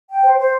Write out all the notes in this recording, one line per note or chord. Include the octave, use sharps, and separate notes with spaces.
G5
C5
C5